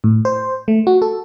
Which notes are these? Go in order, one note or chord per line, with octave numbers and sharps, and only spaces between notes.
A2
C5
A3
F#4
A4